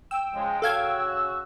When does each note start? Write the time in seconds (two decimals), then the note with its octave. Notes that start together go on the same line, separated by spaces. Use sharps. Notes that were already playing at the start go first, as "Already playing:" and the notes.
0.11 G5 E6
0.34 C#3 F3 G#3
0.62 C#3 F#4 A4 F5 E6 G#6